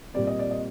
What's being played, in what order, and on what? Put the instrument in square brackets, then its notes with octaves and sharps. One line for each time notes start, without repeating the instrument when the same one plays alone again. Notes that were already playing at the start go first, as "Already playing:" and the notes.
[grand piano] A#2 G3 C4 D5
D#5
D5
D#5